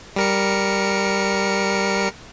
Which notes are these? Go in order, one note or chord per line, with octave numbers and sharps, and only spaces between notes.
G3 A#4 C#7